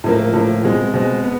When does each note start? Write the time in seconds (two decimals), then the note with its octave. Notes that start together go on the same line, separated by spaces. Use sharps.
0.04 A2 F3 A#3
0.34 A2 F3 A#3
0.64 B2 G#3 C4
0.94 B2 G#3 C4
1.24 B3